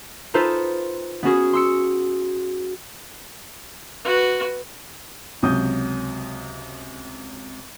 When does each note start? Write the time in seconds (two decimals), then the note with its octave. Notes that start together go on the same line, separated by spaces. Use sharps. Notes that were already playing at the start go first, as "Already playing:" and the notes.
0.34 D#4 F4 A4 B4 C5
1.23 B3 C#4 F#4 G#4
1.53 C6 E6 C#7
4.04 F#4 B4
5.42 C#2 C3 F#3 D#6 G6